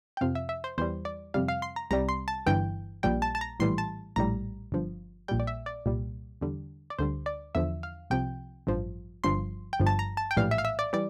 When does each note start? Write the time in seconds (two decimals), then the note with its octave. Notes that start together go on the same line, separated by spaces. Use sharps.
0.17 G5
0.21 F2 C3 F3 F5
0.35 E5
0.49 E5
0.64 C5
0.78 E2 E3 G3 C5
1.05 D5
1.34 F2 C3 G3 F5
1.48 F5
1.62 C6
1.76 A#5
1.91 C2 C3 G3 A#5
2.09 C6
2.28 A5
2.46 G1 G2 E3 G5
3.03 A#1 A#2 G3 G5
3.22 A5
3.35 A5
3.41 A#5
3.60 A#1 A2 E3 G3 C6
3.78 A5
4.16 A#1 A2 G3 A#5
4.72 G1 G2 F3
5.28 A#1 A#2 G3 G5
5.40 D5
5.47 E5
5.66 D5
5.86 C2 A#2 G3
6.41 E2 D3 G3
6.90 D5
6.99 D2 D3 G3 C5
7.26 D5
7.55 E2 D3 F3 E5
7.83 F5
8.10 C2 C3 F3 G5
8.67 A1 G2 F3
9.24 G1 G2 F3 C6
9.73 G5
9.80 G1 G2 F3
9.87 A5
9.99 A#5
10.17 A5
10.31 G5
10.37 A#1 A2 E3 G3 F5
10.51 E5
10.58 F5
10.65 E5
10.79 D5
10.93 E3 G3 D5